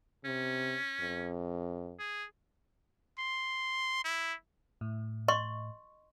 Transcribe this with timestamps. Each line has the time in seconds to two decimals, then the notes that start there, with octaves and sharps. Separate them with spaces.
0.25 C3 C#4
1.00 F2
1.99 G#4
3.19 C6
4.05 E4
4.81 A2
5.28 D#5 C6 C#6